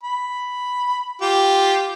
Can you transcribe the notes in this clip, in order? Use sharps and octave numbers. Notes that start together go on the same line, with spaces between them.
B5
F4 G4